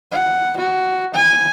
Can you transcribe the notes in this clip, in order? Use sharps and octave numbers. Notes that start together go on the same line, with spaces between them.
F#5
F#4
G#5